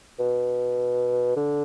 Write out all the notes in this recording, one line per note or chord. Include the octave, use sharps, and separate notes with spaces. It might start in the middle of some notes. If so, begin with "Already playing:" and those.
B2
D3